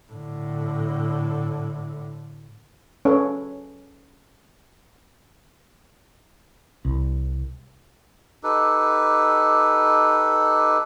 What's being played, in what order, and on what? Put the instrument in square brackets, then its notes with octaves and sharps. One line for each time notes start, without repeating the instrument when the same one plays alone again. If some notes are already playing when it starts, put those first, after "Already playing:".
[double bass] A2 D3
[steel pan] C#4 A4 B4 C#5
[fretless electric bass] C2
[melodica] D#4 G4 A4 B4